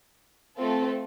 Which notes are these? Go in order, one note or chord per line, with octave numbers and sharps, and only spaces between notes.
A3 C4 F4 A4